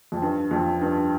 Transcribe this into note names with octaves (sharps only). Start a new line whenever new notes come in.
F2
G2
F2
G2